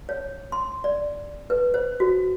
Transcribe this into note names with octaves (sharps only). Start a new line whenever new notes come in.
C#5
C6
D5
B4
C5
F#4